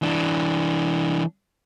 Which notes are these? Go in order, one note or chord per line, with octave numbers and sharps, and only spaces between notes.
E3 D4